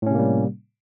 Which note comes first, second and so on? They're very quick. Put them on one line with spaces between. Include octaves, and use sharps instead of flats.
A2 C#4 C3 A#3 G3